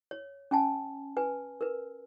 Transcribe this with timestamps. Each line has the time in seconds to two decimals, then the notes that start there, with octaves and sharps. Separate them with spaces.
0.11 C#5
0.51 C#4 G#5 A5
1.17 B4 G#5
1.61 A#4 B4